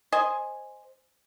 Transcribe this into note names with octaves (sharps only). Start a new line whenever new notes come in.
C5 D#5 G#5